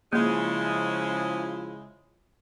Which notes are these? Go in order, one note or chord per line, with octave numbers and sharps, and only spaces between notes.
C#3 F3 G#3 A#3 E4